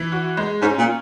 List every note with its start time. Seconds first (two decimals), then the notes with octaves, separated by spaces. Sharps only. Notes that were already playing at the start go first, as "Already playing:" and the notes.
Already playing: E3
0.12 F#4
0.37 G#3
0.61 G#2 C#4
0.78 A#2